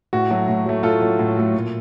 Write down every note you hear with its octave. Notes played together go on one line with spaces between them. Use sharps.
A2 F#4
F#3 A3
A2
F#3 A3
A2 F4 A4
F#3 A3
A2
F#3 A3
A#2